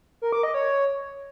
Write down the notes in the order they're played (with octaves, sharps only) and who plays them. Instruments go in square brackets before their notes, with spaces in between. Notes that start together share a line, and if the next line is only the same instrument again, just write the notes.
[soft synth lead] A#4
D6
D#5
C#5